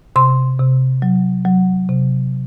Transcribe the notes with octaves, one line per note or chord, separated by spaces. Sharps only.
C3 C6
C3
F#3
F#3
C3